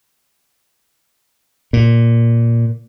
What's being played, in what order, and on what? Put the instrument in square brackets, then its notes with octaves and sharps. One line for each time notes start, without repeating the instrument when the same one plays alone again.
[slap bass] A#2